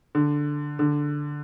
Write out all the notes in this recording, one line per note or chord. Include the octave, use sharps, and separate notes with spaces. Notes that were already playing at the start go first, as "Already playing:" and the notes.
D3
D3